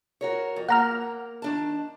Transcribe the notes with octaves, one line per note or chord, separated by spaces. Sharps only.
F#4 A#4 C#5
F2
A#3 F#5 A#5 F6
D#3 D4 A5